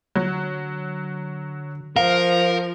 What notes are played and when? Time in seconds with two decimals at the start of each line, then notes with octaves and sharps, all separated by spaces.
0.16 D3 F#3
1.96 F3 A#4 F5